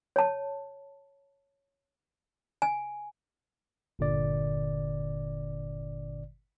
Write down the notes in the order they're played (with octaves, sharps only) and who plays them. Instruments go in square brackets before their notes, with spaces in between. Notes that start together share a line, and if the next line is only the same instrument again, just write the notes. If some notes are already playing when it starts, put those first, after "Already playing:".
[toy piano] C#5 A5
G#5
[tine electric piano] G1 A#2 D3 D5